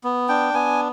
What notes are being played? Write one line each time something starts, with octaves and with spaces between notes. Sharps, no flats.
B3
D4 G5
B3 G#5